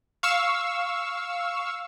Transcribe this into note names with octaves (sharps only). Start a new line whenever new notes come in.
F5 C#6 E6